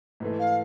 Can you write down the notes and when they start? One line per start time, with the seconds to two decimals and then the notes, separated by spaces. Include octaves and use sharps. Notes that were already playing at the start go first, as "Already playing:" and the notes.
0.20 G#2 E3 A3
0.39 F5